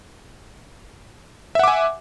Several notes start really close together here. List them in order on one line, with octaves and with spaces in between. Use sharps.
E5 F#5 D6 G#5